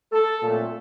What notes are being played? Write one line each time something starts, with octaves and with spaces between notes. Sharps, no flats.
A4
A#2 F#3 A3 C4